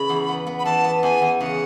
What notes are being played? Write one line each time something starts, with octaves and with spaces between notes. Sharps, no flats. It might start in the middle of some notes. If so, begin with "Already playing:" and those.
Already playing: C#3 E3 B5
E2
B3
B3
B5
E3 A5
B3
E2 G#5
E2
C#3 F#5